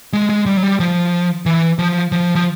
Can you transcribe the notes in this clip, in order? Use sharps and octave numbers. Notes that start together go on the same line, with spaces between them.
G#3
G#3
G3
F#3
G3
F3
E3
F3
F3
F3